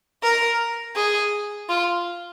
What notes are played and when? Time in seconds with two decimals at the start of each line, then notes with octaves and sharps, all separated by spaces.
0.23 A#4
0.96 G#4
1.69 F4